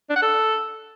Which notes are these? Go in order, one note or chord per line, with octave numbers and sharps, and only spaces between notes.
D4
F#5
A4